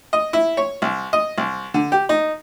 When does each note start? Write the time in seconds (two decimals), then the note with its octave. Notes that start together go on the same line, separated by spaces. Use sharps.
0.13 D#5
0.33 E4
0.57 C#5
0.82 C2
1.13 D#5
1.38 C2
1.74 D3
1.92 G4
2.09 D#4